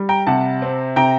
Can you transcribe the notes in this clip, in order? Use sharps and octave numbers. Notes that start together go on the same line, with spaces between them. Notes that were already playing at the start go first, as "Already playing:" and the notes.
Already playing: G3
G5 A#5
C3 F#5 A5
C4
C3 G5 A#5